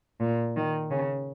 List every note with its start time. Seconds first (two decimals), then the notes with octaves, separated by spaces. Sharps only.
0.20 A#2
0.57 D#3
0.91 C#3